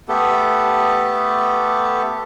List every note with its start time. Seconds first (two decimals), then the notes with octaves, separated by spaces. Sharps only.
0.08 A3 B3 G4 A4